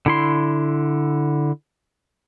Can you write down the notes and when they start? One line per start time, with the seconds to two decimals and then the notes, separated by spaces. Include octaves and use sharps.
0.06 D3 E4 C6